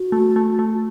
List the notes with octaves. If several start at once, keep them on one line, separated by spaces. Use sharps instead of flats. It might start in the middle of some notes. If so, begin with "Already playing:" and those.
Already playing: F#4
A3
A3
A3